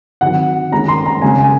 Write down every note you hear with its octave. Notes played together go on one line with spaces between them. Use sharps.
D#3 F#3 C4 F#5
D#3 G#3 C#4 A#5
C6
A#5
C#3 G#3 C#4 G#5
G#5